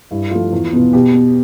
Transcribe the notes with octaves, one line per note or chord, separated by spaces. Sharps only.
G2 E4
F3 A3 F4
E2
B2 B3
B2 G4
B3